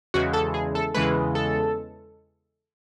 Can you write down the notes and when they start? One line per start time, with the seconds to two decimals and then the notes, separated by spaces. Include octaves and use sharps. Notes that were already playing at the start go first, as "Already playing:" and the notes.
0.14 E2 C#3 E3 G#3 F#4
0.33 A4
0.54 G#4
0.75 A4
0.95 E2 C#3 E3 G#3 B4
1.35 A4